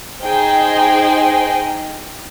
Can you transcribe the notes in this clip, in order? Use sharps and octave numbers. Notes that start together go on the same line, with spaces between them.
D#4 G#4 C5 G5